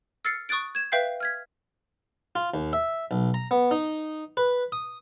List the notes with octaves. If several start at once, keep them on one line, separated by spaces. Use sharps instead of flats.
E6 F6 A6 C7 C#7
C#6 D#6 F#6 A6 D7
G#6 E7
B4 E5 F5 G5 G6 C7
F6 G#6 B6
F4
D#2
E5
B1
A#5
B3
D#4
B4
D#6